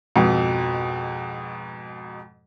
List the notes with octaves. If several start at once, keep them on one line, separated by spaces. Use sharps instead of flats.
F2 G#2 B2